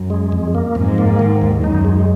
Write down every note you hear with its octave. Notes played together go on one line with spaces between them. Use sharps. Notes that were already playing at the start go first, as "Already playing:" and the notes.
Already playing: F#2
G#3
F2
A#3
F2 G#2
A#3
D#3
D#2
F#2 D#4
G#3